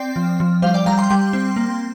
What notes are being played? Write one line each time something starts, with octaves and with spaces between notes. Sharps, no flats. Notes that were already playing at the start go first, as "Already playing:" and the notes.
Already playing: C4 D5 G5
F3
F3
G3 C5 F5
D5 G5
G3 F5 A#5
G5 C6
G3 G5 C6
C4
A#3